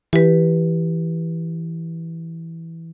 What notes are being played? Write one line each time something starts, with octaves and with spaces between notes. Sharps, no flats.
E3 G4 B4